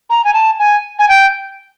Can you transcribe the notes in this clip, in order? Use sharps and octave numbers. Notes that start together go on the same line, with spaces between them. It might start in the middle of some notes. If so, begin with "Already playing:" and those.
A#5
G#5
A5
G#5
G#5
G5